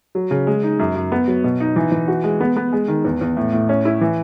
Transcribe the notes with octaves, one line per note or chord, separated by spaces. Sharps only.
F#3
C#3
G#3
D#4
F#2
F#2
B3
F#3
B2
D#4
E3
E3
F#4
G#3
B3
B3
G#3
D#3
E2
E2
A2
A2
C#4
E4
E3